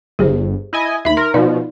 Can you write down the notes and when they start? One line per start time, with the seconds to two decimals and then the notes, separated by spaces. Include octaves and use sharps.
0.19 G1 G4 G#4 C5
0.73 E4 D#5 G#5
1.05 D#2 D#4 E5 B5
1.17 A#4 C6
1.34 B2 F3 D#4 D5 F5